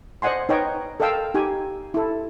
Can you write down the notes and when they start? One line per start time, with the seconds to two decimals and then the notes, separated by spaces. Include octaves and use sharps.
0.22 C5 D5 D#5 F#5 G#5 C6
0.49 D#4 B4 C#5 D#5 G5
1.00 A4 A#4 D#5 F5 G5 E6
1.34 D#4 G4 G#5
1.94 E4 A4